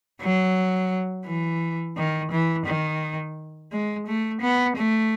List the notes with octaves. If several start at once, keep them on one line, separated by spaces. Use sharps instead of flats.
F#3
E3
D#3
E3
D#3
G#3
A3
B3
A3